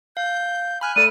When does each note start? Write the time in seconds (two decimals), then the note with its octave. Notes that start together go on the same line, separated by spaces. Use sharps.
0.17 F5 G6
0.81 G#5 B5 F6 F#6
0.96 A3 A4 D5 D#7